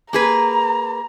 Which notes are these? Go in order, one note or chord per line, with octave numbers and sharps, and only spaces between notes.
A#3 G#4 B4 A#5